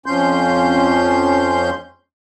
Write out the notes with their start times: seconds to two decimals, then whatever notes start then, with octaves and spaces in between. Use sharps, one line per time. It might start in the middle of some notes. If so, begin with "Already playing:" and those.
0.06 F2 F3 C#4 C6 G6